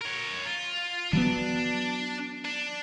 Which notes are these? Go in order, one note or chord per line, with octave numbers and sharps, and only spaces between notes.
A#4 C#5
F4
E3 F#3 B3 D4
D4